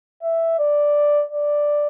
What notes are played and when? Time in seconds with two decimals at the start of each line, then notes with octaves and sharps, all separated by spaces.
0.23 E5
0.59 D5
1.31 D5